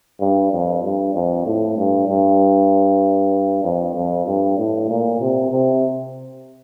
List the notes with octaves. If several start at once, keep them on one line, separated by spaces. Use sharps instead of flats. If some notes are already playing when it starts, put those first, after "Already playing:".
G2
F2
G2
F2
A2
G2
G2
F2
F2
G2
A2
A#2
C3
C3